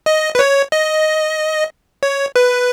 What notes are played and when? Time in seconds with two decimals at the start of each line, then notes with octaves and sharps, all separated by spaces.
0.06 D#5
0.35 B4
0.39 C#5
0.72 D#5
2.03 C#5
2.36 B4